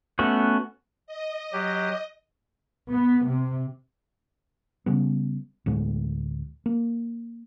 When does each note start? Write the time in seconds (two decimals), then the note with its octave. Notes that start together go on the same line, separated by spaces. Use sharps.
0.19 A3 B3 C#4 F#4
1.07 D#5
1.52 F#3 G4
2.90 B3
3.26 C3
4.86 C#3 G3 B3
5.66 D2 A2 G#3
6.66 A#3